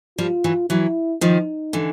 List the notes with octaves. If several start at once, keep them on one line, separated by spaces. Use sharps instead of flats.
F3 G3 F4
E3 F#3
E3 F#3 E4
D#3 F3 D#4
D3 E3